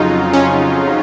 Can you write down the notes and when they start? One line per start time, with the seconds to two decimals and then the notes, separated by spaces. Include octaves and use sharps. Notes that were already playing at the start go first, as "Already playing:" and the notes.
Already playing: F2 C#3 F#3 D#4 F4
0.33 C#4